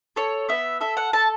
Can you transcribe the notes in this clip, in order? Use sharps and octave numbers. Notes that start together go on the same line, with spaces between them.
A4 C#5
B3 E5
A4 E5
F#5
A4 A5